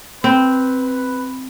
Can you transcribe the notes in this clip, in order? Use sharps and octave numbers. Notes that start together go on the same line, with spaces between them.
C4 B4